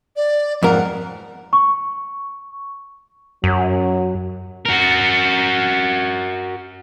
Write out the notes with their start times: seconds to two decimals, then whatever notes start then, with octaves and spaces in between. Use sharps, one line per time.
0.16 D5
0.63 F2 G#2 A#4 F#5
1.53 C#6
3.44 F#2 F#3
4.66 F#4 A#4